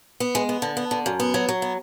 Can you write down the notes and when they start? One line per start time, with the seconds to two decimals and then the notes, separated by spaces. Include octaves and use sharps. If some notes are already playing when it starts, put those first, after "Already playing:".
0.20 B3
0.35 G#3
0.49 B3
0.62 D3
0.77 B3
0.91 D3
1.06 F#2
1.20 B3
1.34 F#3
1.49 F#3
1.62 B3